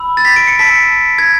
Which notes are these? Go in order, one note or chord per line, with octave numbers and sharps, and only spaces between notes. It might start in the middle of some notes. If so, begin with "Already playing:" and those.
Already playing: B5 E6
A6
B6
D7
C#7
A5 E6 B6
G#6